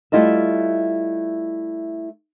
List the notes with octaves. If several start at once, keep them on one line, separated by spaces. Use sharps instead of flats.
G3 A3 E4 F4 D#5 E5